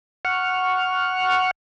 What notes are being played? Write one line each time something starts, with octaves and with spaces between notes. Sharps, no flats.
F#5 C#6 F6